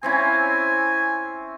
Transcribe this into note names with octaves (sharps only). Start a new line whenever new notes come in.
C4 C#4 E4 G#5